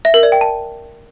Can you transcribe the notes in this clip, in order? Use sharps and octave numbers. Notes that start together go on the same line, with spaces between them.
E5
A#4
D5
G5
A5